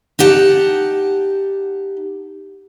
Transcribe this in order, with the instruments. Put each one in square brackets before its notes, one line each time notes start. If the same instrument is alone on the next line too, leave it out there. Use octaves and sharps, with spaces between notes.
[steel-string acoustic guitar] D#4 G4 F#5 A5